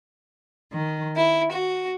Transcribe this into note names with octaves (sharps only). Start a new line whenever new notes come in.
D#3
E4
F#4